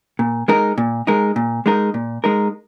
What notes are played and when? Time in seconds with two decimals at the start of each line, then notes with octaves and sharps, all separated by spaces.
0.19 A#2
0.48 G#3 D#4 A#4
0.78 A#2
1.07 G#3 D#4 A#4
1.36 A#2
1.66 G#3 D#4 A#4
1.94 A#2
2.24 G#3 D#4 A#4